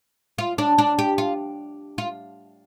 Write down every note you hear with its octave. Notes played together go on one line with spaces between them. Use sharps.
F4
D4
D4
G4
F4
F4